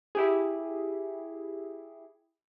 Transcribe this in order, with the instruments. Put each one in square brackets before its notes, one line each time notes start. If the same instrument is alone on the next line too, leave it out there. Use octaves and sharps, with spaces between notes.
[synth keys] E4 G4 G#4